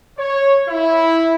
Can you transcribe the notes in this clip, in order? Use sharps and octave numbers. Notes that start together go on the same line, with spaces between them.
C#5
E4